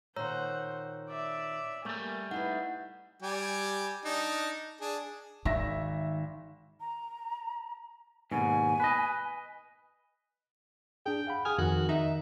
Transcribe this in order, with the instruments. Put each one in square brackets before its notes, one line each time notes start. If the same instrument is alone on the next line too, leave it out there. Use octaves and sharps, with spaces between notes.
[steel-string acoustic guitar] A#2 D#3 [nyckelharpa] C5 F#5 [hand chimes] C#5 A#5 E6
[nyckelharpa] D5 E5
[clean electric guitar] G3 A3 [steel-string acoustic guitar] A#3 [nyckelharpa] G#5
[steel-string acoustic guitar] D#4 E4 B4 [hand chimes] F#5
[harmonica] G3 G4 G#5
D4 D#4
D4 G#4
[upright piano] G#1 E5 A#6 [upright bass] D#3
[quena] A#5
[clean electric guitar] D#2 G#2 B2 [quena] G#5
[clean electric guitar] B4 D#5
[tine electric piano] D4 G#4 [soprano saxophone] G5
[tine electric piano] F5 F#5 B5
[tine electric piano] G#4 D#6 F6 [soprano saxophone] G#5
[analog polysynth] F2 [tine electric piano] D#3 [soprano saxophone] F#4
[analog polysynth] D#4 [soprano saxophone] E5